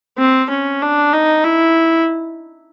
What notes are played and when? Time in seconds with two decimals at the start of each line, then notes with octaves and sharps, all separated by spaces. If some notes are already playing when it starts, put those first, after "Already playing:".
0.18 C4
0.50 C#4
0.81 D4
1.13 D#4
1.44 E4